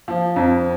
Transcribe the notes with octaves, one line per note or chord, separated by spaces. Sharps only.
F3
F2